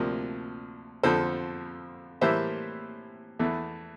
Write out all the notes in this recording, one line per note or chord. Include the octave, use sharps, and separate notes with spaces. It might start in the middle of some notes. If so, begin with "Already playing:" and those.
Already playing: D2 C3 F3 A#3
F2 D3 F3 A4 C5
A2 E3 G3 A#3 C5 E5
E2 E3 A3